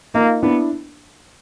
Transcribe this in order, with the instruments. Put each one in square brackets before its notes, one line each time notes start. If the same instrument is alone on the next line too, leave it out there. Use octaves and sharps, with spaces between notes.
[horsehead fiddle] A#3 [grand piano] D#4 F4
[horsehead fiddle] B3 [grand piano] D4 E4